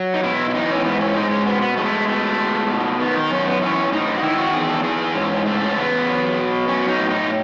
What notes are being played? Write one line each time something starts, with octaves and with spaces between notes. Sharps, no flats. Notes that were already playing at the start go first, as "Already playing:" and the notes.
Already playing: F#3
D#4
B2 E4
E4
E3 D#4
C#4
G#2 B3
C#4
G#3 D#4
C#4
B2 B3
B3
G#3 A3
B2 A3
G#3
B2
D#3 B3
D#4
F#2 C#4
B3
E3 C#4
A2 D#4
F#4
D#3 E4
F#4
E2 G#4
A4
E3 G#4
G#2 C#4
C#3 A3
C#4
E2 B3
F#3
B2
F#3 C#4
D#4
A2
D#4